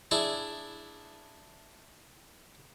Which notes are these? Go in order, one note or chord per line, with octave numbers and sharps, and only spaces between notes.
D4 E4 G#4